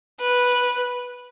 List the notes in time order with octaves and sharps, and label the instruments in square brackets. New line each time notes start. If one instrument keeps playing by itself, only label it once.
[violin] B4